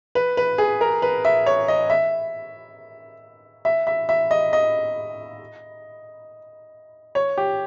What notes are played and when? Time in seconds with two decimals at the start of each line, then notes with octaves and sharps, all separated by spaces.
0.15 B4
0.37 B4
0.58 G#4
0.81 A#4
1.02 B4
1.25 E5
1.46 C#5
1.68 D#5
1.90 E5
3.65 E5
3.87 E5
4.09 E5
4.31 D#5
4.53 D#5
7.15 C#5
7.38 G4